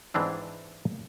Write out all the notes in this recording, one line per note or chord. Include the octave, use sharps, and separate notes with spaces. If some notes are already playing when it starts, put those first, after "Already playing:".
G#2 E3 C4 D4 E4